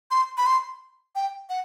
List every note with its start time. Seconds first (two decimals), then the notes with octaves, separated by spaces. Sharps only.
0.11 C6
0.38 B5
0.46 C6
1.15 G5
1.49 F#5